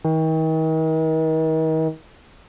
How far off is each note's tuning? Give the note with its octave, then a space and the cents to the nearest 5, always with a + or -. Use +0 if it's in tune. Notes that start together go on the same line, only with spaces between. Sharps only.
D#3 +40